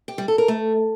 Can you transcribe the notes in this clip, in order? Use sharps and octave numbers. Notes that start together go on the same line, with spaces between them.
G4
G3
A4
A#4
A3